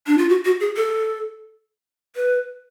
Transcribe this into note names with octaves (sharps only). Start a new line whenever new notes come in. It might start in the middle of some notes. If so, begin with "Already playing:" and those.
D4
F4
F#4
F#4
G#4
A4
B4